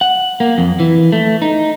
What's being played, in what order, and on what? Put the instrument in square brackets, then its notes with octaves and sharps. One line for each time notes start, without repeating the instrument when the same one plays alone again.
[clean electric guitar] F#5
A#3
F2
E3
A3
D#4